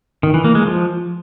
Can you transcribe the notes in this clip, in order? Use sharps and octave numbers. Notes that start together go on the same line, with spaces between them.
D#3
E3
A#3
G#3
F3